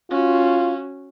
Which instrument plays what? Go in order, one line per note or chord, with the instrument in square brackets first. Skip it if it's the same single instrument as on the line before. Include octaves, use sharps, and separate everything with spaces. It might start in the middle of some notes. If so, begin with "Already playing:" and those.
[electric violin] C#4 F#4 [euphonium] F4